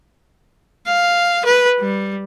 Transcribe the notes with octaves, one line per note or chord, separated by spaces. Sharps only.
F5
B4
G3